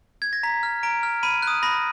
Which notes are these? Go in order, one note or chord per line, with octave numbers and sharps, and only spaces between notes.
G#6
A#6
A#5 B6
F6
A#5 D7
F6
B5 D#7
F#6
D#6
B5 A#6